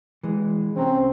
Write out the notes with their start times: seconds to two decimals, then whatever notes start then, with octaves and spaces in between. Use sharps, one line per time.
0.23 E3 G#3
0.76 C2 C4 C#4 A#5